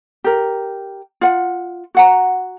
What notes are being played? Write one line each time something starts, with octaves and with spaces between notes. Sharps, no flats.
G4 A#4
F4 F#5
F#4 F#5 A#5